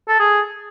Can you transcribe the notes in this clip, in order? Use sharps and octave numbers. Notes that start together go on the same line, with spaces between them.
A4
G#4